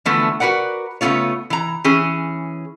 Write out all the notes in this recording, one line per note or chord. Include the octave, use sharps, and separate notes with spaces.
D3 E3 F3 A3 B3
F#4 A#4 B4 D5 F#5
C#3 A3 B3 C4 F4 C#5
E3 A#5
E3 C#4 G#4